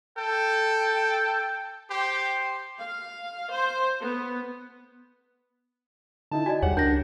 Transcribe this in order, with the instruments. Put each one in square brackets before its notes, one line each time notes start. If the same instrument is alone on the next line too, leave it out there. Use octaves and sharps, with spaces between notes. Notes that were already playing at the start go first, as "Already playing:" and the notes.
[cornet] A4 [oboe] G5
[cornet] G4 [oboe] C5
[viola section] F5
C5
B3
[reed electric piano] D3 D#4 E4 [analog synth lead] A5
[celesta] F#4 D5 D#5 [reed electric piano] G#5
[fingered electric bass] E2 G3 [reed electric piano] G4 G#4 [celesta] C#5 [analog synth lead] F#5
[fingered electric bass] C#2 [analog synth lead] D4 [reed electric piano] A#4 [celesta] G6 A#6